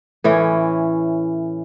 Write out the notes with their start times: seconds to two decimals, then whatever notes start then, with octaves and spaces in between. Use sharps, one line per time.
0.24 A2 E3 C#4